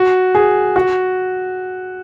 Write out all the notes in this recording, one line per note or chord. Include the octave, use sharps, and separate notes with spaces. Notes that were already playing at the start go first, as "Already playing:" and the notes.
Already playing: F#4
G#4
F#4